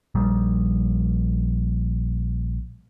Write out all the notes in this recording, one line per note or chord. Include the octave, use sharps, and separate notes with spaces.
A#1 G3